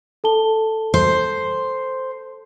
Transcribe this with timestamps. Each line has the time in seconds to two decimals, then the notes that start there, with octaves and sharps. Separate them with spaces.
0.24 A4 A5 G7
0.94 C5